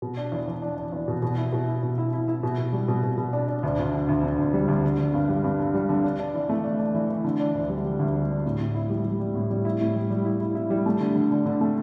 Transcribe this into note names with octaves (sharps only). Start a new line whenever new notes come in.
B2
D4
E2
E2
D4
D4
E2
B2
B2
E4
B2
E4
B2
E4
E4
E4
B2
B2
G3
B2
B2
B2
D4
D4
D2
D2
D3
D2
D3
D2
G3
D2
D3
D3
G2
G3
G2
D3
G3
D3
D4
D4
E3
A3
D4
D4
E3
E3
D3
D4
D2
G3
G3
D2
G3
D4
A2
A2
E4
G3
G3
G3
A2
G3
E4
A2
G3
G3
E4
E4
E4
G3
A3
D3
D3
D3
D3
A3